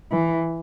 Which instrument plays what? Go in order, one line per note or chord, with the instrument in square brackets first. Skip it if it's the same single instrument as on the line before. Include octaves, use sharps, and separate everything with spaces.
[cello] E3